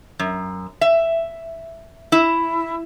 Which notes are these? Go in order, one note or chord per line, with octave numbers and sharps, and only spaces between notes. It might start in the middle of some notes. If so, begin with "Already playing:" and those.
F#2
E5
E4